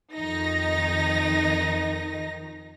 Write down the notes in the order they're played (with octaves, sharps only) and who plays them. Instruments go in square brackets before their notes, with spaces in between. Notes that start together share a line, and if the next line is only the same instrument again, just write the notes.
[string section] F2 D#3 D#4 A#6